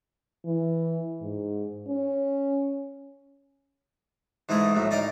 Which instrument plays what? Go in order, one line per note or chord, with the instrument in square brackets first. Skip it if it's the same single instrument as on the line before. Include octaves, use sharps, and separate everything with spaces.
[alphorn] E3
G#2
C#4
[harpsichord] G#2 E3 G#3 A3 G#4
A#1 A2 F#3
D#4 D5 D#5 F5 G5